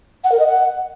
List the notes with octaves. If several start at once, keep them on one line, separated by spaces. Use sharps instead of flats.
F#5
A#4
D#5
F#5